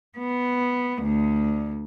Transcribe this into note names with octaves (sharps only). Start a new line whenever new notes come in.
B3
D2